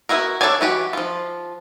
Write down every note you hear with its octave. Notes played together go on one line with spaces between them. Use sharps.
B3 E4 F#4 A#4
D4 A4 C#5 D5 G#5
E3 F#4 G4
F3 F4